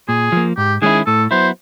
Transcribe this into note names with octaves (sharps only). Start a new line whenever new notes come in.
A#2 G#4
F3 A#3
G#2 G4
D#3 G#3 C#4 E4 G#4
A2 A4
F#3 B3 E4 C5